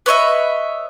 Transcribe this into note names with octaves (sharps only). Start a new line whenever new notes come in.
B4 C#5 D#5 E5